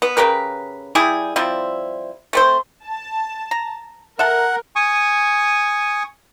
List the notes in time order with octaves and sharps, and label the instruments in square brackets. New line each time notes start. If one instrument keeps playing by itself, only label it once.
[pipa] B3
C#3 G4 A#4 B4
G3 E4 G4 G#4
F3 G3 C4 E4
A3 C4 C5
[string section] A5
[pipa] A#5
[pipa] A4 E5 [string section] A#4 [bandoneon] F#5
[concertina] G#5 C#6 D#6